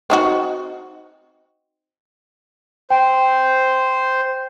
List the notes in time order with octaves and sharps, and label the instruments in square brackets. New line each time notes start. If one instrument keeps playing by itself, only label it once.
[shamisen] C4 D#4 F#4
[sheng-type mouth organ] C5 [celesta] G5